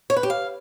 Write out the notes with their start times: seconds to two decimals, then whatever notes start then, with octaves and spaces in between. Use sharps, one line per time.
0.10 C#5
0.16 B4
0.23 G4
0.30 F5